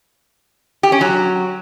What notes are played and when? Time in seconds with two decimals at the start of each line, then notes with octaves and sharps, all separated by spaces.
0.83 G4
0.92 C#4
1.01 F#3